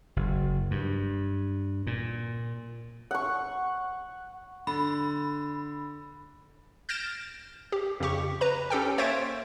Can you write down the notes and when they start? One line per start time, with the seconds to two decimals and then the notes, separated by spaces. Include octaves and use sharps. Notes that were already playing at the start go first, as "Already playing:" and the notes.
0.16 F#1
0.71 G2
1.87 A#2
3.11 F#5 C#6
4.67 D3 B5
6.89 F6 G6 A6 A#6 D7 E7
7.72 G4
8.00 F2 C#3 G4 C#6
8.41 B4 A#5
8.70 C#4 G4 A4 G5
8.98 A#3 C5 C#5 E5 A6 D7